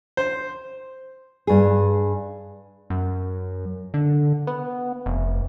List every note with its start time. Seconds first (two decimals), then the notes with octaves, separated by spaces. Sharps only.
0.17 C5
1.47 G2 G#4
2.90 F#2
3.94 D3
4.47 B3
5.06 F1